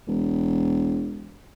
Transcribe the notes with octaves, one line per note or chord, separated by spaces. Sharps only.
E1